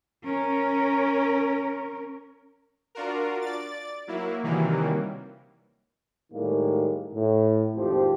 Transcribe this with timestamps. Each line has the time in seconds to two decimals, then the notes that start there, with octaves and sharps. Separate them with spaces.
0.25 C#4 A#4
2.95 D4 F4 F#4 A#4
3.42 D5 A6
4.07 F#3 A#3 E4
4.43 C3 D#3 E3 F#3 G3 A#3
6.33 A2 D#3 G3 G#3 A#3
7.13 A2
7.75 G#1 F2 A#2 F3 G4 C5